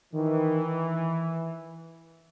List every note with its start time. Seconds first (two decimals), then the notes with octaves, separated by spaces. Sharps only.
0.14 D#3 E3